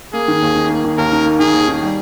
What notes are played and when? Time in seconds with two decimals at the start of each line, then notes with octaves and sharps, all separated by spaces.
0.13 A#3 G#4
0.28 D#3
0.42 D#2
0.56 D#4
0.70 A#3
0.84 D#3
0.98 D#2 A#4
1.12 D#4
1.25 A#3
1.39 D#3 G#4
1.53 D#2
1.68 D#4
1.83 G3